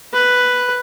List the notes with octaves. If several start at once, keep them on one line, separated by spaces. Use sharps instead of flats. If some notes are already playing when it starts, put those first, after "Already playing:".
B4